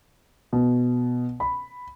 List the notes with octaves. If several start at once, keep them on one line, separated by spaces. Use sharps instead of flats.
B2
B5